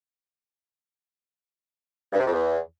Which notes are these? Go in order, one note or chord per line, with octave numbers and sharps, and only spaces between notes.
G2
C3
F2
E2